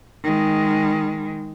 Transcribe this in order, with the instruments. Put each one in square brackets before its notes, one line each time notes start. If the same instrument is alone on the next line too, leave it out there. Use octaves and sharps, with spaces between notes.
[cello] D#3 G#3